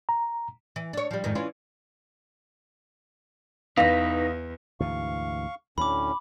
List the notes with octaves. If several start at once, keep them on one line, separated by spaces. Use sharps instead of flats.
A#5
E3
D4 C#5
F3 G3
F2 G#2 D#3
E3 C#4 F4
E2 D#4 B4 F5 A#6
D2 G#2 E3 F5 C#6
D2 A2 C#4 B5 D6